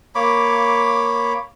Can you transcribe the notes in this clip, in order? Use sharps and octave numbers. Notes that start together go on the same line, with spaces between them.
A#3 C#5 B5 D6